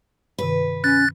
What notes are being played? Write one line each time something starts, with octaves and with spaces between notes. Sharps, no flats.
G2 C3 D#3 B4
C#4 F#6 A6